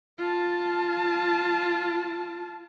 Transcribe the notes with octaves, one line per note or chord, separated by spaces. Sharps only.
F4 A5